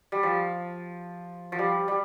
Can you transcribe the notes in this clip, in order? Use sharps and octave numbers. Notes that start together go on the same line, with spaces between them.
G3
F3
F3
G3
G3